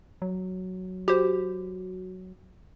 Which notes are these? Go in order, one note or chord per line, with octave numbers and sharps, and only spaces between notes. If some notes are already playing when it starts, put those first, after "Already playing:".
F#3
F#4 G4 C5